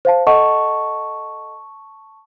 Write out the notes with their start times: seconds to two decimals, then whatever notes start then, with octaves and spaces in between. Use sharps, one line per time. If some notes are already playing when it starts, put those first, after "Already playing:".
0.05 C5 F5 A5
0.27 A4 D#5 F#5 A5 C#6